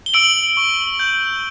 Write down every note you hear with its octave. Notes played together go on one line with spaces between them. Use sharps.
G7
E6 D7 F#7
C#6
G6